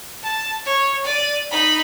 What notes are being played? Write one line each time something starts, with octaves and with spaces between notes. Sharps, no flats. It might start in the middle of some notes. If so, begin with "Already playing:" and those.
A5
C#5
D5 D#7
D#4 B5